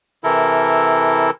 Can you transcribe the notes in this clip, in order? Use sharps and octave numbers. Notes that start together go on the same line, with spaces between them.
C3 E3 E4 A4 A#4